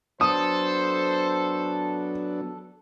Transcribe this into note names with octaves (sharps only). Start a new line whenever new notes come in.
F#3 B3 D4 A4 C5 D#6